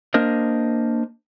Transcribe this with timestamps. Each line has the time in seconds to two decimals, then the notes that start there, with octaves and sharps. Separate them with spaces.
0.14 A#3 D4 A#4 C5 D#5